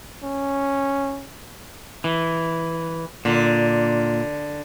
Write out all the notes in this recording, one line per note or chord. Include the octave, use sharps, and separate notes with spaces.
C#4
E3
A#2 D3